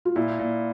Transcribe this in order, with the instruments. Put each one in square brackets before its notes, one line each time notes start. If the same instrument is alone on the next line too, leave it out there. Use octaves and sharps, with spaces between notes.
[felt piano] F4
[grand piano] A#2 [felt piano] E4
[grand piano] A#2